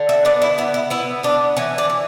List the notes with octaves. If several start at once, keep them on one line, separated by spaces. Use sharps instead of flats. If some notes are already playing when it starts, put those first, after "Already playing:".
Already playing: D3
E5
B3 D5
E4
B3 E4
E4
B3 E4
B3 D4
E3 C#4
D4
E3